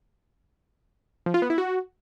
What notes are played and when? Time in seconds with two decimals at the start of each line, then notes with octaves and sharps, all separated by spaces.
1.26 F3
1.34 F4
1.42 B3
1.50 E4
1.58 F#4